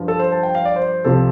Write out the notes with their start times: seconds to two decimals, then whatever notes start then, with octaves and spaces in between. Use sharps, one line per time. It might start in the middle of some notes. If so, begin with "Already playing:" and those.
Already playing: G2 F3
0.08 A4
0.19 C5
0.32 A5
0.43 G5
0.55 F5
0.65 D5
0.76 C5
1.04 C2 C3 F3 A4